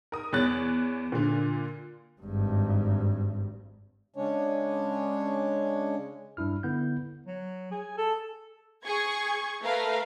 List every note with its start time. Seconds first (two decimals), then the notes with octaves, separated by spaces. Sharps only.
0.12 A#4 D#6
0.33 E2 C#5 F#6 A6
1.12 A#2 D3
2.21 G#1 G2
4.16 C#3 G#3 C#4 D4 C#5
6.37 G2 D4 E4 F6
6.63 D3 B3 E4 G6
7.27 F#3
7.71 G#4
7.98 A4
8.84 G#4 C#6 G#6
9.62 A3 A#4 B4 F5